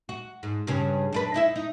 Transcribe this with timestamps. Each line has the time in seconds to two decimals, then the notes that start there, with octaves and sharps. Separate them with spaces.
0.09 F#4
0.43 G#2
0.67 G2 C#3 C#4
1.13 F#2 D4 B4
1.34 D#4 E4 E5
1.56 D#4